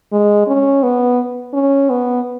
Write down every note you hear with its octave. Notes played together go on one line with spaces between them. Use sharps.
G#3
C#4
B3
C#4
B3